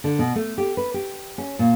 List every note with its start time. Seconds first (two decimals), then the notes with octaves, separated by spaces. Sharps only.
0.04 D3
0.19 B2
0.35 A3
0.58 G4
0.77 B4
0.94 G4
1.38 C#4
1.59 A#2